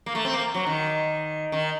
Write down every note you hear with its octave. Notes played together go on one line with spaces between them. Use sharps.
A#3
A3
C4
A#3
F#3
D#3
D#3